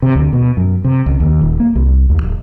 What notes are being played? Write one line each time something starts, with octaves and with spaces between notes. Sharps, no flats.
C3
D2
B2
F#2
C3
C#2
D#2
D#1
A#3
C2
D#2
D1